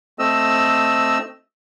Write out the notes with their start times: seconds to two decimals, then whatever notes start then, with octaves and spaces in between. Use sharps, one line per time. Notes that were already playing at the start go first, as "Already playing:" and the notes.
0.19 A3 C4 D#5 E6